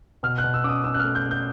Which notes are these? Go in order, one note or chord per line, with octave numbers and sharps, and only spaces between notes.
B2 F6
F#6
B2
E6
C#4 D6 D#6
C#4 E6
F#6
F6
A3
G6
A3
G6